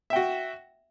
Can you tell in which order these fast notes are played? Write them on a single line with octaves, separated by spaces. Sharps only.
E5 G5 F#4